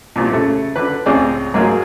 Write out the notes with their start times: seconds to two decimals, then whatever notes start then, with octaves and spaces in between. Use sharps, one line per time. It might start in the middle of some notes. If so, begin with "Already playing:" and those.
0.16 C2 A#2
0.31 C#3 A3
0.76 D3 B4
1.06 C#2 A2 C4 G#4 D5
1.54 G#2 F#3 G#3 A#3 G#4